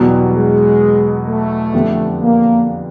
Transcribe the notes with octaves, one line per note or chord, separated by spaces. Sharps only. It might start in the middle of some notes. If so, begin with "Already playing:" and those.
Already playing: E2 B2 F#3 G3 B3
G#3
A3
F2 D3 G3 B3 D4
A#3